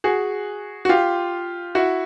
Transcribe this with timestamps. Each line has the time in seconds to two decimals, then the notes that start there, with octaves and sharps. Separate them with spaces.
0.04 F#4 G#4
0.85 F#4
0.89 F4 G4
1.75 E4 F#4